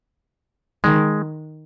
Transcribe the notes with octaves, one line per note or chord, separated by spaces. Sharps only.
D#3 G#3